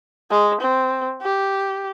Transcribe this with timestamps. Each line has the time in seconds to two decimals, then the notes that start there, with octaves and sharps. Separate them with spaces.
0.31 G#3
0.61 C4
1.22 G4